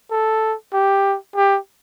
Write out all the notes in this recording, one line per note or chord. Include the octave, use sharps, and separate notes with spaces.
A4
G4
G4